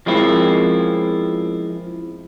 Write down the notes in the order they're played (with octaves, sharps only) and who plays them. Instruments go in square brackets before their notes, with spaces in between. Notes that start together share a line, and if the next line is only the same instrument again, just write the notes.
[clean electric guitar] F3 G#3 A#3 C4 C#4 E4